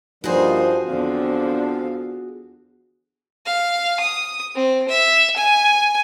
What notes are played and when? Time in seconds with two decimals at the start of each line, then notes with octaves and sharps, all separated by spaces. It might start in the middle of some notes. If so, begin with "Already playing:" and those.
0.24 G2 F3 G3 A#3 D#4 F#4 G#4 C5
0.87 E2 D3 F3 C4 D4 F5
3.46 F5
4.00 D#6
4.55 C4
4.88 E5
5.36 G#5